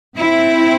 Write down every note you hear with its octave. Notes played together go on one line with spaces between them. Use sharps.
C4 E4